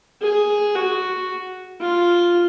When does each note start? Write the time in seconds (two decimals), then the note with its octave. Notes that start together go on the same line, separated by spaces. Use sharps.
0.22 G#4
0.75 F#4
1.81 F4